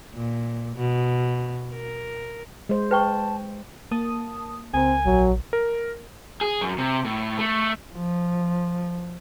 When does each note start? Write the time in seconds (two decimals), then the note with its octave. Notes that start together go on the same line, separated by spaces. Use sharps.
0.14 A#2
0.76 B2
1.74 A#4
2.69 G#3 C5
2.91 B4 G5 A5 C#6
3.91 A#3 A5 D#6
4.74 C#2 C4 A#4 G#5
5.06 A#1 F#3
5.53 A#4
6.41 G#4
6.61 F#2
6.78 C3
7.05 A2
7.39 A3
7.94 F3